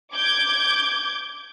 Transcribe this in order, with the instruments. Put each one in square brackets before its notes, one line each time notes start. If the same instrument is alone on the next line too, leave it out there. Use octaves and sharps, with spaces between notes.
[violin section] D6 G6 G#6